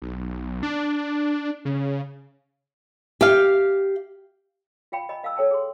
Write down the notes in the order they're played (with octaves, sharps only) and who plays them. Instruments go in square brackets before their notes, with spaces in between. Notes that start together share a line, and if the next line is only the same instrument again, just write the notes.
[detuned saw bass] B1
D4
C#3
[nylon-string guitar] G4 F5
[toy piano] F4 F5 G5 B5
D#5 G#5 A#5 B5
D#5 F5 A5 E6
A4 C#5 G5 A5
G#4 C6